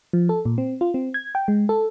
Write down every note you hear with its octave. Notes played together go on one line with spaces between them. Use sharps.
F3
A4
A#2
C4
F4
C4
G#6
G5
G#3
A4